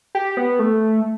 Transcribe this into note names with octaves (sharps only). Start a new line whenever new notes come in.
G4
B3
A3